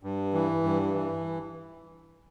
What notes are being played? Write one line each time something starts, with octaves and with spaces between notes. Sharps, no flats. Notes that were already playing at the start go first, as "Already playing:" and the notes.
G2
E3
G2
E3